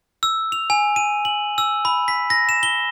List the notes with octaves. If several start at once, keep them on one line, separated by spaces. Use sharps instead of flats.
E6
F7
G#5
D#7
F#7
E6
B5
B6
A#6
E7
G7